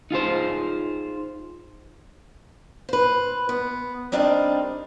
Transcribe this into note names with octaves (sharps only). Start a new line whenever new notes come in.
D#4 F4 G#4 C5
B4 C5
B3
G3 C4 D4 D#4 A#4 A5